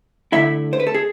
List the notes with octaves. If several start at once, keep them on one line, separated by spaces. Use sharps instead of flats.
D3 A3 E4 E5
C5
B4
A4
G#4